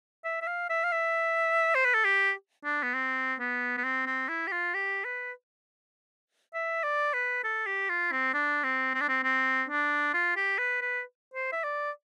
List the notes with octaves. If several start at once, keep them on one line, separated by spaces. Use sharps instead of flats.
E5
E5
F5
E5
F5
E5
C5
B4
A4
G4
D4
B3
C4
B3
B3
C4
C4
E4
G4
F4
G4
B4
E5
D5
B4
A4
G4
F4
C4
D4
C4
C4
D4
C4
C4
D4
F4
G4
B4
B4
C5
E5
D5